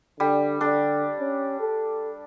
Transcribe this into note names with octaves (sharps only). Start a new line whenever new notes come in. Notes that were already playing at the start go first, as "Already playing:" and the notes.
D3 G3
D3 D4
C#4
A4